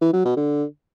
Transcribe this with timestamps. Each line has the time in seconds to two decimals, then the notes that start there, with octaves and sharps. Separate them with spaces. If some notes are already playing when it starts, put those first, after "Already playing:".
0.01 E3
0.13 F#3
0.25 B2
0.37 D3